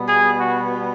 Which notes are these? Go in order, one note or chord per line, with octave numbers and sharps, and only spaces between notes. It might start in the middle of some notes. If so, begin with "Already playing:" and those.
Already playing: B2 G3 B3
G#4
F#4